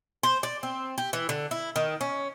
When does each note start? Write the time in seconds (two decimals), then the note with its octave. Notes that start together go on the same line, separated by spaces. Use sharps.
0.23 C5
0.43 D5
0.63 C4
0.98 G4
1.13 E3
1.29 D3
1.51 E4
1.76 D#3
2.01 C#4